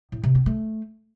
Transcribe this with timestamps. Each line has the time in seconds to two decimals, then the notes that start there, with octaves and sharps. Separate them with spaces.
0.12 A2
0.23 C3
0.35 C4
0.46 A3